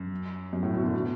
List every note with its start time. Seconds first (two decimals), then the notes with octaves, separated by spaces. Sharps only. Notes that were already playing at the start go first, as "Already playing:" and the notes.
Already playing: F#2
0.53 F#2
0.63 A2
0.73 B2
0.84 D3
0.94 B2